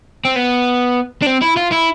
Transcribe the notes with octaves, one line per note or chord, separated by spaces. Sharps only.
C4
B3
D4
C4
E4
F4
E4